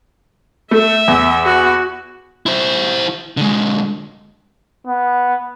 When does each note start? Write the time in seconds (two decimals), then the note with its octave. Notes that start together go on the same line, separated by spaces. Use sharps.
0.71 A3 E5
1.08 E2
1.45 F#4
2.46 E4 C5
3.37 D3 G#3
4.87 B3